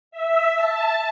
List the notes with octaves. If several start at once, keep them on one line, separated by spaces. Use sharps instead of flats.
E5
A5